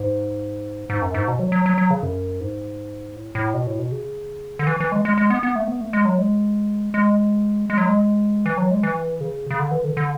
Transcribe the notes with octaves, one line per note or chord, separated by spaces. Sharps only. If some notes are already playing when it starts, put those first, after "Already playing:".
Already playing: G#2
G#2
F#2
G#2
B2
F#3
F#3
F#3
F#3
C#3
F#2
G#2
A2
A2
B2
A2
B2
C#3
D3
E3
E3
G#3
G#3
G#3
B3
B3
A3
B3
A3
G#3
F#3
G#3
G#3
G#3
F#3
G#3
E3
F#3
G#3
E3
C#3
C#3
D3
E3
D3
D3